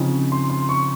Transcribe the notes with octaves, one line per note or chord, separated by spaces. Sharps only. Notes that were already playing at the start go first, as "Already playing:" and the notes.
Already playing: C#3 F3 C4 D#4
C6
C6
C#6